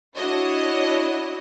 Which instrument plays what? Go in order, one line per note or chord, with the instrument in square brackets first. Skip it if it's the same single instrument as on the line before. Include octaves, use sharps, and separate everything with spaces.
[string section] D4 E4 F#4 C#5 D#5